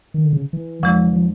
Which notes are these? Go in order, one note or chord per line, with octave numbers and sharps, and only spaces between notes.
D#3
D3
C#3
E3
F2 C#3 E3 F3 G#3
F3